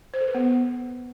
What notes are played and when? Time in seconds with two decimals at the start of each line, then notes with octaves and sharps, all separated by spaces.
0.14 C5
0.21 A4
0.28 B4
0.35 B3